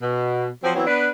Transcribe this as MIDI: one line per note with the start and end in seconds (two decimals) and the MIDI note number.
0.02 0.47 47
0.63 0.72 53
0.63 0.72 54
0.63 0.72 60
0.75 0.87 52
0.75 0.87 54
0.75 0.87 59
0.75 0.87 60
0.75 0.87 64
0.87 1.09 59
0.87 1.09 62
0.87 1.09 71